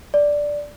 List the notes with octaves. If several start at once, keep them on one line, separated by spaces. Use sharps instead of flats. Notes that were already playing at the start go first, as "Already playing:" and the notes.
D5